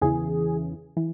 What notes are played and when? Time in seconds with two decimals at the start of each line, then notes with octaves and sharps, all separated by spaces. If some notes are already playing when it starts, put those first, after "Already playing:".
0.01 E2 C#3 E3 G#4
0.97 E3